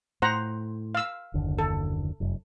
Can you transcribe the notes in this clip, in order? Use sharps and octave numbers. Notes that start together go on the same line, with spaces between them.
A2 C5 F#5 A#5
F5 E6
F#1 D#2 D3
A4
F1 F#2